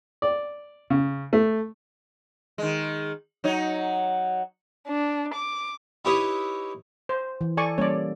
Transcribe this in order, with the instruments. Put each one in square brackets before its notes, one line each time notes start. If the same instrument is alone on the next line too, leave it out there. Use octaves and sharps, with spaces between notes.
[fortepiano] D5
C#3
A3
[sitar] D#3 G#3
F#3 D#4 C#5
[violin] D4
D6
[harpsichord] D#4 E4 G4 B4 C#5 D#6
[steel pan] C5
[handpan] E3
[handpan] A4 [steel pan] D5 G#5 C#6
[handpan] G3 A#3 C#4 [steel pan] C#5 D5